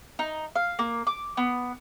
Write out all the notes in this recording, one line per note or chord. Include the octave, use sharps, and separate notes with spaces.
D#4
F5
A#3
D6
B3